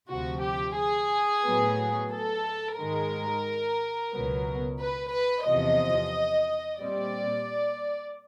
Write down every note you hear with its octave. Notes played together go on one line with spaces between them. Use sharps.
D2 C3 F3 F#4
G4
G#4
A2 F#3 B3
A4
G#2 D#3 G#3 A#4
C#2 B2 F#3 B3
B4
B4
E2 C3 F3 D#5
A#2 G3 C4 D5